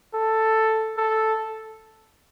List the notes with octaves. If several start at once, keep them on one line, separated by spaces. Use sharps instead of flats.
A4
A4